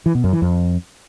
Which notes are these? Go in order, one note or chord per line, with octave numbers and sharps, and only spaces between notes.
E3
B2
F#2
E3
F2